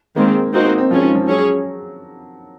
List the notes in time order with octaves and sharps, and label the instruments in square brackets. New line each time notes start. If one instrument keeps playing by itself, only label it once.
[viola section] D#3 G#3 C4 [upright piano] A#3
[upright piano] A#3 [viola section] C4 D#4 F#4 C5
[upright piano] A#3
C4
[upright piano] F3 [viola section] G#3 C#4 F4
[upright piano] D#3
F3
[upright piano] F#3 [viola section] C#4 G#4 C#5